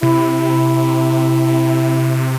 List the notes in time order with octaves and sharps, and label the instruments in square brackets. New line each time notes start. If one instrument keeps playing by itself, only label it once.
[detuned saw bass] C3 [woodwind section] E4